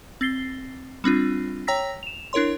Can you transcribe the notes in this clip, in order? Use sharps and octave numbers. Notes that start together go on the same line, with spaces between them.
C4 A6 C7 G7
G3 C4 D4 F4
C#5 G5 A#5 E6 A#6 B6
E7 F7
D4 E4 A#4 C#5 C6